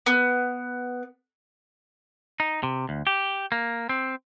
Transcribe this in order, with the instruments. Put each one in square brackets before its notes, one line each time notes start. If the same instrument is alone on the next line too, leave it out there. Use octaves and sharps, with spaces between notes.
[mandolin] B3
[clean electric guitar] D#4
C3
D2
G4
A#3
C4